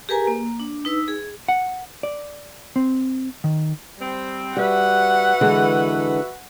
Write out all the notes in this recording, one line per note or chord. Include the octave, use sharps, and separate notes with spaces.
G4 G#4 A#4 B4 G#5 A#5
A#3
D4
D#4 B4 E6
G#4
F#5
D5
C4
D#3
G3 C4
G3 F#4 B4 E5 F#5
D3 E3 G#3